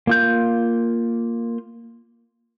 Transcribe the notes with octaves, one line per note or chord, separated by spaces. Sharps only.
A#3 F4 G6